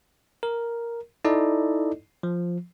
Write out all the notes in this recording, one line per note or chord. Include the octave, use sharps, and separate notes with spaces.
A#4
D#4 E4 A4 D5 D#5
F3